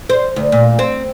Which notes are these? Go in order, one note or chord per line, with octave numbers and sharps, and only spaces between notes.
C5
D2
A#2
C4